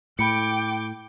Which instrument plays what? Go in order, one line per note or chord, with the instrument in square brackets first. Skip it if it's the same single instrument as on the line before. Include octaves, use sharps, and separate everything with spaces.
[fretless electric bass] A2 [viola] G5 D6 [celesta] B5 C#7